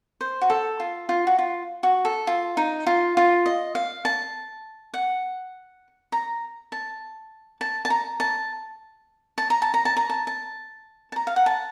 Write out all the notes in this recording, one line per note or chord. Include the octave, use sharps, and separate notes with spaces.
C5
F#4
A4
F4
F4
F#4
F4
F#4
A4
F4
D#4
F4
F4
D#5
F5
A5
F#5
A#5
A5
A5
A5
A#5
A5
A5
A#5
A5
A#5
A5
A#5
A5
A5
A5
A#5
F5
F#5
A5